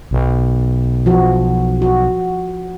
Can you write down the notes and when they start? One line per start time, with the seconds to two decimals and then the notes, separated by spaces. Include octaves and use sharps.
0.11 B1
1.06 F3 F#4
1.82 F#4